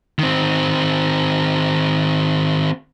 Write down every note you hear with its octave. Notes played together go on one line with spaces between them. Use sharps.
D#3 C4